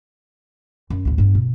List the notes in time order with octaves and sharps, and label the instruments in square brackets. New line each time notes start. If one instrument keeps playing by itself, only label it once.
[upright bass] F#2
A1 D2
G2 B3
B2